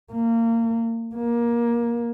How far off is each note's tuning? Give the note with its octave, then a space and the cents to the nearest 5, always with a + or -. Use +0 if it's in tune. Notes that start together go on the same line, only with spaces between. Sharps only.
A#3 -25
A#3 +20